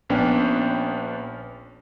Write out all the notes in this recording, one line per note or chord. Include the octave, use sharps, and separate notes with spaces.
A#1 B3 C#4 D4 G5